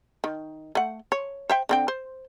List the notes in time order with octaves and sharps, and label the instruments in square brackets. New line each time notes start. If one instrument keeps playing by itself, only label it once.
[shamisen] D#3
A3 F#5
C#5
C5 E5 G5
D3 C4 G5
C5